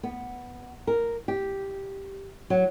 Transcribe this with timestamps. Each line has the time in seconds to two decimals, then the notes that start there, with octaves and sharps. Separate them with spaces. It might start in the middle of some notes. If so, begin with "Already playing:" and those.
0.03 B3
0.87 A#4
1.28 G4
2.50 F#3